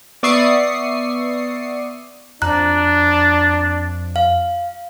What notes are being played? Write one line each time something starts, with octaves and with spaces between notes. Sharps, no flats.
B3 D5 E5 C#6 D#6 C7
F2 D4 A#5 F#6
F5